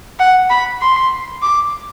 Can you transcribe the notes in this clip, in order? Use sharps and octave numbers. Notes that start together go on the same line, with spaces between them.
F#5
B5
C6
D6